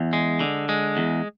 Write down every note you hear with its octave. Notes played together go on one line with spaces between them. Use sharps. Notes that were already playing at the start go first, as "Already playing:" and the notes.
Already playing: E2
G#3
D3
G#3
E2